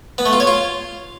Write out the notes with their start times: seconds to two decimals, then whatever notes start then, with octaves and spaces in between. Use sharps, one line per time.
0.18 B3
0.26 A3
0.33 F4
0.40 C#5
0.47 F4